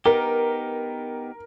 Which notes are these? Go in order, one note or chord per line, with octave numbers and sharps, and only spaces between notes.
B3 D#4 G4 A#4